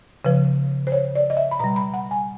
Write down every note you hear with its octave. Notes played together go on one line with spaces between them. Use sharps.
C#3 F3 B4
C5
C#5
D5
D#5
E5
B5
B2 G3 A#5
B5
F#5
G#5